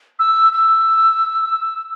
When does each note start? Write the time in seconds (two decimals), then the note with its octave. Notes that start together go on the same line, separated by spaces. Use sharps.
0.19 E6
0.53 E6